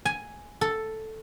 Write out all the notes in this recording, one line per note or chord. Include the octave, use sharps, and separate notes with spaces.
G#5
A4